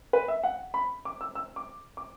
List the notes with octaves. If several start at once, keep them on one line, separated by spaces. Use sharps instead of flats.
B4
E5
F#5
B5
D6
E6
E6
D6
D6